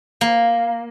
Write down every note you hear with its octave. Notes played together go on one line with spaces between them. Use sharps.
A#3